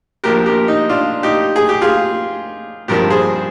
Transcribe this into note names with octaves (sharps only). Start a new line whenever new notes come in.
A#1 A#2 F3 G4 A#4
G4 A#4
D#4
D4 F4
D#4 G4
G#4
G4
F4 G#4
G#1 G2 F3 G4 A#4
G#4 C5